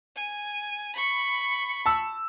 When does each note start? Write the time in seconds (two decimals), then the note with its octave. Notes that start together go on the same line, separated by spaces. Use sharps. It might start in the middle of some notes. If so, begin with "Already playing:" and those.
0.16 G#5
0.96 B5 C#6
1.86 A5 E6